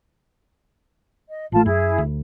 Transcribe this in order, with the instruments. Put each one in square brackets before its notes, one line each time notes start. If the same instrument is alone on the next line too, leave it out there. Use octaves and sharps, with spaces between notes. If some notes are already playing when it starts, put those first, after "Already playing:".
[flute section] D#5
[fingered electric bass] A1 A3 [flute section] F4 A5
[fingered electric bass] F#2 [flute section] E4 G#4
[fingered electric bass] D2